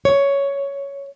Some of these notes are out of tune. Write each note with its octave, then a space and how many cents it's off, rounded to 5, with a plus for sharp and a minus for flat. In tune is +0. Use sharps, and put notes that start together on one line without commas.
C#5 +10